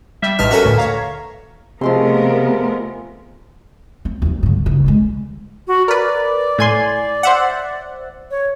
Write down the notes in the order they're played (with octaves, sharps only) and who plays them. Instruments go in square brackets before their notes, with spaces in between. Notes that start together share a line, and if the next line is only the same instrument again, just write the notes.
[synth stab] G3 [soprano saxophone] E5
[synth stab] A1 G2 F6 [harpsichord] D#4 A5 [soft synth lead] B4
[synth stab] C#4 F#4 [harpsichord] A4 A#4 C#6
[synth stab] D2 [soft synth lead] A2
[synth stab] C#5 F5 [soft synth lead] A#5
[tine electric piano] C3 [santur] F3 G#3 C6 [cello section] A3 B3 A#4
[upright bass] C4
D#2 F#3
G2 D3
F#1 D#3
D2 G#3
[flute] F#4
[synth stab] A#4 B4 [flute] D5
[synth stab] A2 G#5 C6
C5 E5 F#5
[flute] C#5